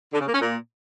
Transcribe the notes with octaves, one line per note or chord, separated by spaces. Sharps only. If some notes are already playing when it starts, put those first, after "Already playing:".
D3
C#3
A#3
C#4
A#2